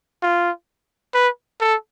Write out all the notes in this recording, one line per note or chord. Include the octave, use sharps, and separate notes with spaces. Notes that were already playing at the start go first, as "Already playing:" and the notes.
F4
B4
A4